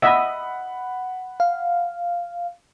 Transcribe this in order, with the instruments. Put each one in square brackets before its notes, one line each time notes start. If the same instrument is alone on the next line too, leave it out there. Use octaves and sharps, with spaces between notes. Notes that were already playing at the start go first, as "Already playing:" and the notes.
[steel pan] D#5 E5 [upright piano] F#5 B5
[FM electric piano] F5